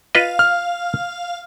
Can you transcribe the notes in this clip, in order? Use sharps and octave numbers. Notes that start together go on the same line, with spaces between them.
F4 B4 D#5 F5
F6